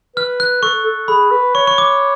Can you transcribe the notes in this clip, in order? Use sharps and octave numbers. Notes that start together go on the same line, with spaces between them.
B4 F6
F#6
A4 C#6
A4
G#4 B5
B4
C#5 C#6
C#6
D6